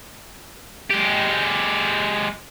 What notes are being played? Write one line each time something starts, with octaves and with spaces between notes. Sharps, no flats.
G#3 G4